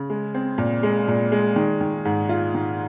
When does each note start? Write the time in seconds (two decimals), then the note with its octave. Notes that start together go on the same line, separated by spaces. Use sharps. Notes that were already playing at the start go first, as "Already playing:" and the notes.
Already playing: C#3
0.10 G#3
0.34 C4
0.58 A#2
0.83 G#3
1.08 A#2
1.32 G#3
1.56 D#3
1.81 D#3
2.05 G#2
2.29 F4
2.54 D#3